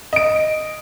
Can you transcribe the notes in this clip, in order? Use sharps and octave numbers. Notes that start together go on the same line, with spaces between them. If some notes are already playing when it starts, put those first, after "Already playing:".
D#5 D7